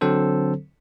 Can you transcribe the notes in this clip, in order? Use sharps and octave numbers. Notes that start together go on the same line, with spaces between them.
D3 F#3 C4 A4 C5